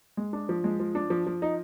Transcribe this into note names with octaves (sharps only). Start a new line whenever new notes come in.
G#3
D4
F3
G#3
F3
D4
F3
F3
D#4